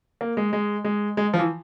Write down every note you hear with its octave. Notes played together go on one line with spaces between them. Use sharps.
A#3
G#3
G#3
G#3
G#3
F3
E3